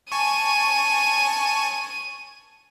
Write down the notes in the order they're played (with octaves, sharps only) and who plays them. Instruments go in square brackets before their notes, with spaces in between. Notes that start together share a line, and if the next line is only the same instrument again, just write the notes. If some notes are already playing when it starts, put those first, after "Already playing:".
[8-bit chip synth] G#5 A5 C#6 [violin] D#7